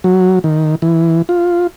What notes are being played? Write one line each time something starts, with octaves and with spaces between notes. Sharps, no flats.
F#3
D#3
E3
F4